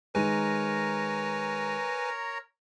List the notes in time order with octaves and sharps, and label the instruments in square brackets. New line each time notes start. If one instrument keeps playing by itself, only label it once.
[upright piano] D#3 G#3 D#7 [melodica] A#4 C#5 A#5 [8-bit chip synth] B4 G#5